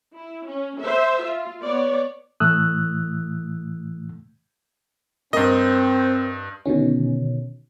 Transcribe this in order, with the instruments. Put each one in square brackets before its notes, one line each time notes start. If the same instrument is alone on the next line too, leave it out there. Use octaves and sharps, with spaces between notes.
[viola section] E4
C#4
C5 E5
F4
B3 C#5 D5
[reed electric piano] A2 E3 A3 D#6 E6 F#6
[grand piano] G2 D#5 [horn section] C4 [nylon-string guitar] A#4
[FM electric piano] B2 D3 D#3 C#4